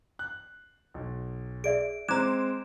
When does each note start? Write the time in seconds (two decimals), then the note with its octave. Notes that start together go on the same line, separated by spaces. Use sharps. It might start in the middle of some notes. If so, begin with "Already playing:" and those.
0.19 F#6
0.94 B1
1.64 G#4 D5 E5 D7
2.08 G#3 C4 A#5 D6 F#6 G#6 E7